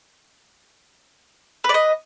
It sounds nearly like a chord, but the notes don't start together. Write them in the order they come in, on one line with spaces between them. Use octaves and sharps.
B4 D5 D#5